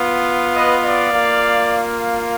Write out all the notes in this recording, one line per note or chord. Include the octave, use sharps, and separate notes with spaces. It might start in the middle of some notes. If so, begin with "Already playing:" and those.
Already playing: B3 F4
B4 D#5
D5 F5
A#3 F4